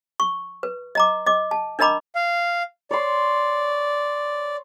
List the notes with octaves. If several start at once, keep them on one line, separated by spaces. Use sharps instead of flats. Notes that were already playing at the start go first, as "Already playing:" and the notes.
C#6
B4
D#5 A#5 D6
D#5 D6
A5
D4 A#4 D#5 A#5 B5 D6
F5
C#5 D5 C6